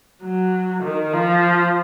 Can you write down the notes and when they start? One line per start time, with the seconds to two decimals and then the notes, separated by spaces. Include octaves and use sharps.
0.23 F#3
0.83 D#3
1.13 F3